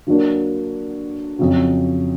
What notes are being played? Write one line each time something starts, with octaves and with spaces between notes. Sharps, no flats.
D3 F#3 A#3 D4
F2 C#3 F#3